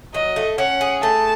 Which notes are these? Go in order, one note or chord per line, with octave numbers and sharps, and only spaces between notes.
F#3 D#5
A3
C#4 F#5
G#4
A3 A5